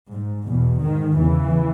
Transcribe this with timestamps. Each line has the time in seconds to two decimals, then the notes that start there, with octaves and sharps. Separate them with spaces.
0.11 G#2
0.46 E2 B2
0.81 G#2 D#3
1.17 E2 C#3 E3